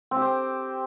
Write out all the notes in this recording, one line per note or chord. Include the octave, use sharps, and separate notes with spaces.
C4
G4
C4